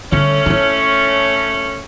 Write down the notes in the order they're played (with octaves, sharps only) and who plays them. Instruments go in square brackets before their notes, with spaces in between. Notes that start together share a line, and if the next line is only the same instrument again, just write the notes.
[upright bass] D3 G3 [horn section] A3 C#4
[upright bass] D#4 E4